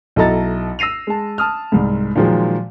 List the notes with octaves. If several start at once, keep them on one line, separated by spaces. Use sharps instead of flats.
B1 E4 A4 D#5 A#5 A6
E6 A#6 C7 D#7 F7
G#3 A5
A5 D#6 F6
C2 G#2
A#2 D#3 F3 F#3 G#3